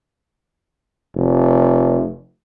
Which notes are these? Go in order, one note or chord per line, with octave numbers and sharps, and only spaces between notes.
F1